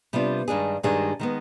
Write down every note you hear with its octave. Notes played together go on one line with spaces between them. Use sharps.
C3 G3 B3 D4 F4
G2 D#3 G#3 D4 G#4
G2 D#3 G#3 D4 G#4
D#3 G#3 B3